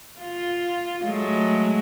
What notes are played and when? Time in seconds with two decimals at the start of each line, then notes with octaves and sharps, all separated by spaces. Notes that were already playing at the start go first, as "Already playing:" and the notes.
0.20 F4
1.04 F#3 G#3 A3